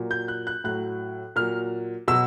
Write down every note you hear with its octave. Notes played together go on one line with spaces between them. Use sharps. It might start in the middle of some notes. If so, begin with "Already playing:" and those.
Already playing: A#2 F#3
G6
F#6
F#6
A2 F#3 F#6
A#2 F#3 F6
B2 F#3 E6